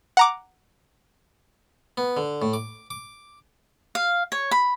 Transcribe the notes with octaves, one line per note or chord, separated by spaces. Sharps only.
F#5 A#5 D6
B3
D3
A2
D6
D6
F5
C#5
B5